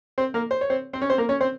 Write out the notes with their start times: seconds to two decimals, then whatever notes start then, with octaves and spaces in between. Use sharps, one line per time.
0.18 C4 C5
0.34 A#3 A#4
0.51 C5
0.61 C#5
0.70 C4 C5
0.93 C4 C5
1.01 C#4 C#5
1.10 C4 C5
1.18 A#3 A#4
1.29 C#4 C#5
1.41 C4 C5